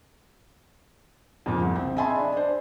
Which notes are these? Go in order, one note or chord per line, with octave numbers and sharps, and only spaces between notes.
F2 A#2 C#3
C2
C4
D#5 E5 G#5 A5 B5 C6
D4
D4 C5